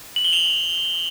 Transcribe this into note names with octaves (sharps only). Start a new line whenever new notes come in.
F#7
G7
F7